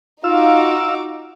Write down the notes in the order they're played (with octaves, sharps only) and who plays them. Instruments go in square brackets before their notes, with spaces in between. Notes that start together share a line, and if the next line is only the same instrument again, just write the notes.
[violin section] D#4 F#4 D6 [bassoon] F4 [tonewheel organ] F5 E6